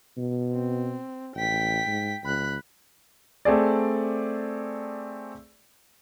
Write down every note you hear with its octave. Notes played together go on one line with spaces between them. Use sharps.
B2
C4
A1 G5 B6
G#2
C#2 B5 F#6
A3 C4 G#4 D5